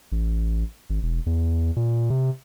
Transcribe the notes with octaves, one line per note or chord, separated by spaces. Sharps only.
A1
G#1
E1
E2
A#2
C3